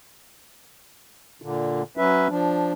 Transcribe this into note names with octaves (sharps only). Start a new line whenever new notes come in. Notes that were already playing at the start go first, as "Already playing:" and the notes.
A#2 D3
F#3 C#4 B4 E5
F3 D4